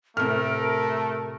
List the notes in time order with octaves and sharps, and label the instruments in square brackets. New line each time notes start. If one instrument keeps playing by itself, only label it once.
[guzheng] A2 C3 [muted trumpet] A3 [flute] A#4 [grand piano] F6